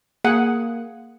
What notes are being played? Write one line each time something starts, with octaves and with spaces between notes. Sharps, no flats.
A#3 G#4 F#5